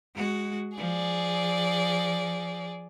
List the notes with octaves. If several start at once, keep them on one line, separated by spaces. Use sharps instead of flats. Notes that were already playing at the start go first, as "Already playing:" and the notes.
G#3 F#4
F3 G#4 D5